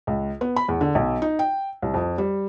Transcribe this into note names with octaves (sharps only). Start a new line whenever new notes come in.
C#2
B3
B5
E2
D3
B1
D#4
G5
C2
F2
G3